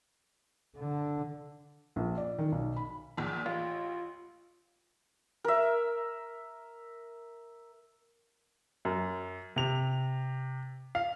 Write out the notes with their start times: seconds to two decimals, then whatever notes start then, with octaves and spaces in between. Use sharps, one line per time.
0.77 D3
1.96 A#1
2.17 D5
2.39 D#3
2.52 B1
2.76 B5
3.17 A#1 E2 A#2
3.46 A1 F4
5.44 A#4 E5
8.85 F#2
9.56 C3 F7
10.95 F5